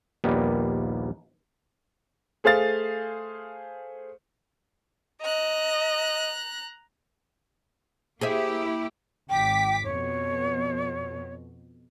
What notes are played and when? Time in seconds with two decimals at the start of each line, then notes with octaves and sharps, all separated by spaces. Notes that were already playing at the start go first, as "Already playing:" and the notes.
0.24 A#1 D#2 G3 A#3 B3
2.44 A3 G#4 C5 F5 A6
5.22 D#5 A#5 F#6
8.21 A#3 E4 G4 G#4 C5 E5
9.29 G#1 G5 D6 B6
9.84 F2 B2 C#5